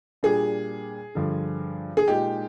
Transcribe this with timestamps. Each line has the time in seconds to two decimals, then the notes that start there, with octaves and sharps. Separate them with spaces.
0.23 A#2 G3 D4 G#4
1.15 G2 D3 F3
1.97 G#4
2.07 A#2 G#3 D#4 G4